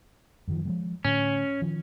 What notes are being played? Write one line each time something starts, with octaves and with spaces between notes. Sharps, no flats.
F#2 D#3 F3
F3 F#3 G#3
A2 D3 C#4
D#3 F3